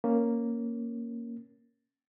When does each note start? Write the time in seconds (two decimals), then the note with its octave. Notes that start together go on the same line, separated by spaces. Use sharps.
0.04 A#3 C#4